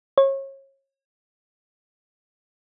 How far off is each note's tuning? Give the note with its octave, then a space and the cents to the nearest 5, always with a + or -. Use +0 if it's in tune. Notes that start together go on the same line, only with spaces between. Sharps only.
C#5 -30